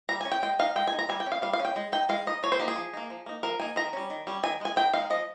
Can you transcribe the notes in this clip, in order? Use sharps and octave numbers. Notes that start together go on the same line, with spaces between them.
G3 A#5
G#5
C#4
G5
G#3 G5
D#4 F5
G#3 G5
G#5
D#4
A#5
G3 G#5
G5
C#4
F5
G3 F5
F5
C#4
G5
G#3
D#4 G5
G#3 F5
D#4 D#5
F3 C#5
C5
A#3 D#4 G4
G#4
F3
A#3 D#4
F3
A#3 D#4
F3 A#4
A#3 D#4 G#5
D#3 A#5
G3 C#4
D#3
G3 C#4
D#3 G#5
G#3 D#4 G#5
D#3 G5
G#3 D#4 F5
F3 D#5